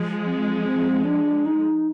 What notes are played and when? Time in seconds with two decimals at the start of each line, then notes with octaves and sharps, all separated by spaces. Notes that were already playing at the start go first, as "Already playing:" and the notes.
Already playing: F3 G#3
0.25 C4
0.64 C4
1.04 D4
1.46 D#4